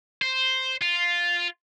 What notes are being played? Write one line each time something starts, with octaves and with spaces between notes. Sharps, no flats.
C5
F4